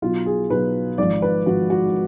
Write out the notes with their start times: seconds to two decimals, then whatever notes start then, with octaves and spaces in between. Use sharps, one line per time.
0.02 B1 B2 F#3 F4
0.26 G#4
0.50 B1 B2 F#3 B4
0.98 G#1 G#2 F3 D5
1.22 B4
1.46 G#1 G#2 F3 F#4
1.70 F#4